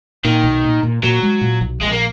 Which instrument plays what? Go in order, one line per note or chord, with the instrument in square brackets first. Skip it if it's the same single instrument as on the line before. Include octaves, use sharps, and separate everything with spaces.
[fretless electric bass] A#2 [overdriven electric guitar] D#3
[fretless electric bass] B1
A#2
A#2
[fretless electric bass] A#2 [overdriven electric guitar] F#3
[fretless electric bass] G#3
A#2
B1
[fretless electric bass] A#1 [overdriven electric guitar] G#3
[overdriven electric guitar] A#3